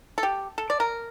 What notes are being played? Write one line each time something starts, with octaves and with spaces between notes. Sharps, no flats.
A4
G4
A4
D5
A#4